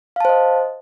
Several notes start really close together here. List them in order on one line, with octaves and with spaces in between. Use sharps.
F5 A5 C5 D#5